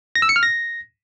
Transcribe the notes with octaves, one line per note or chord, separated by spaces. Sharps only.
A#6
E6
C#7
F6
A#6